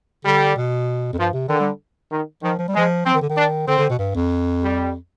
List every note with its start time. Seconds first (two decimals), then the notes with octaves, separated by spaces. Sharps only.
0.25 D3 G3
0.56 B2
1.13 F2
1.18 G2 F3
1.33 C3
1.49 D3 D#3
1.60 G3
2.11 D#3
2.43 D#3 F3
2.59 F3
2.68 G3
2.74 F3 G#3
3.05 F3 C4
3.14 D#3
3.21 D3
3.29 D#3
3.36 D4
3.67 D3 C4
3.78 D3
3.89 B2
3.99 G2
4.15 F2
4.62 G3